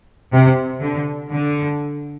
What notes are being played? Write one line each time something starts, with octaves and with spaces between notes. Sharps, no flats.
C3
D3
D3